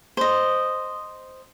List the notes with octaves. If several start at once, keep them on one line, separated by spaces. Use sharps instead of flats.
C5 D#5